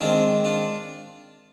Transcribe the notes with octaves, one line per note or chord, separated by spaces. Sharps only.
D#3 G#3 C4 D4 F4
D4 F4